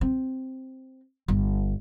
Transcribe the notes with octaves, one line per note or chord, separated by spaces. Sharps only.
C4
G1